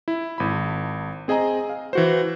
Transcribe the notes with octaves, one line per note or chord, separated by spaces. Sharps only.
E4
G#1 B5
C4 G#4 D#5 G#5 A#5
F5
E3 F#4 C5